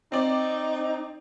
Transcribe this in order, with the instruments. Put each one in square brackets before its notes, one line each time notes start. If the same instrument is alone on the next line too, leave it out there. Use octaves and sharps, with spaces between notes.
[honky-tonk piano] C4 D5 [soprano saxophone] D#4